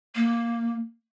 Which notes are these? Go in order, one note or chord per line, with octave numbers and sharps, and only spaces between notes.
A#3